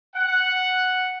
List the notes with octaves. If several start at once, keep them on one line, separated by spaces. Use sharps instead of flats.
F#5